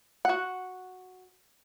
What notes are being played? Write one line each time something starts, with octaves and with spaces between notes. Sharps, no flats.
F#4 F#5